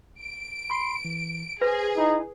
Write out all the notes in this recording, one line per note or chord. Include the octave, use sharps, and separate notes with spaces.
D7
B5 C6 C7
E3
G#4 B4 C5 A#6
D#4 E4